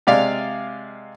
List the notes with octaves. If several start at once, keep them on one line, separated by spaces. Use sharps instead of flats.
C3 G#3 D5 F5